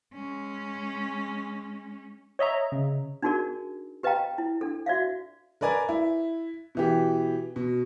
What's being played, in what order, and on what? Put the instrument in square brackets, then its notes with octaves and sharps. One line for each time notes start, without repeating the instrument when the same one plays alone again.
[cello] G#3 C#4
[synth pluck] C#5 D#5 E5 A#5
C#3
[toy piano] D4 D#4 F#4 G#4 A#4 D5
G4 B4 D#5 F5 G5 A#5
E4
D4 A4
F#4 D5 E5 F5
[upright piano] A#4 B4 D5 G#5 A#5
E4
B2 E3 G4
B2